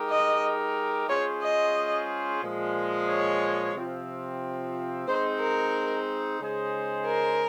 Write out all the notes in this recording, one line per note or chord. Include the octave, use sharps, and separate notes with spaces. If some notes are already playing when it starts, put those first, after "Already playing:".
Already playing: G#3 D#4 G4 A#4
D#5
G#3 C#4 F4 G#4 C5 C#5
D#5
A#2 F3 G#3
C#5
C3 F3 C4 F4
G#3 C4 D#4 C5
A#4
C#3 G#3 D#4 G#4 C5
A#4